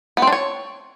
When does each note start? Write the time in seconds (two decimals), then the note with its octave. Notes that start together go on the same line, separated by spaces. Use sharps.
0.17 B3
0.22 C4
0.27 D4
0.32 C#5